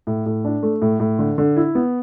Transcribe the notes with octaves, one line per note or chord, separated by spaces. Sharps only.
A2
A2
D4
A3
A2
A2
D3
D3
E4
B3